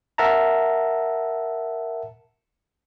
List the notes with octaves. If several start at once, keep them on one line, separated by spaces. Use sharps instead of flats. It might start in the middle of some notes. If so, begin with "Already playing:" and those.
A#4 E5 F#5 A5 A#5